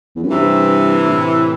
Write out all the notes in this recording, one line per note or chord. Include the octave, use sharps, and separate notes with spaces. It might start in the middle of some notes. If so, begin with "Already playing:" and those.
E2
F#2
G2 C3 E3
A2